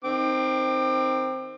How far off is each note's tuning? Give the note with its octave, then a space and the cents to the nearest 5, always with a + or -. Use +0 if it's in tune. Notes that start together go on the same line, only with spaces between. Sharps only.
D#3 +0 C4 +0 D6 +30